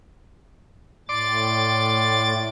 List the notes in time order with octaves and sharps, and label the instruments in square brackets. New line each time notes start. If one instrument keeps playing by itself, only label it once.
[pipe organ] A2 A6 [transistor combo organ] D5 C6 D6